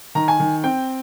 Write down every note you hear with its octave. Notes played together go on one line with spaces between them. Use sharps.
D#3 A#5
G#5
D#3
C4 G5